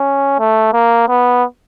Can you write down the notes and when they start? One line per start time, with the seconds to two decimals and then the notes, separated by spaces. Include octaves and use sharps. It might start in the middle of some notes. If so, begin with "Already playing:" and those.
Already playing: C#4
0.40 A3
0.73 A#3
1.08 B3